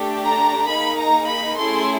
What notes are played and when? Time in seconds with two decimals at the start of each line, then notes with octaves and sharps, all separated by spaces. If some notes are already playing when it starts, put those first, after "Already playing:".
Already playing: A3 D4 G4
0.23 A#5
0.68 A#3 D#4 G#4 B5
0.99 A#5
1.28 B5
1.58 A3 C#4 E4 G#4 C6